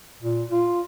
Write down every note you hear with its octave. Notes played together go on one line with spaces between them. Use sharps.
A#2
F4